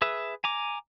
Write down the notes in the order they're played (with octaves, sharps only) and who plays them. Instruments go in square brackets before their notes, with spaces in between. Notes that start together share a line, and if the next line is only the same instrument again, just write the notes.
[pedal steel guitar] G#4 B4 E5
G#5 A#5 D6